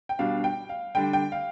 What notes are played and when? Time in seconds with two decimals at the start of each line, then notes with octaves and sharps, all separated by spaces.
0.09 G5
0.19 B2 G3 D4 F5
0.44 G5
0.69 F5
0.95 D3 G3 D4 G5
1.13 G5
1.32 F5